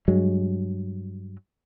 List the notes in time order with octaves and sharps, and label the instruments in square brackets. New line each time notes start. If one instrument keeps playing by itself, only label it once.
[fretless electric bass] G2 F#3 G#3